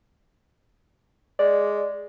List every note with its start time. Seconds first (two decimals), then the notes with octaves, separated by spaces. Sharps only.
1.39 G#3 D5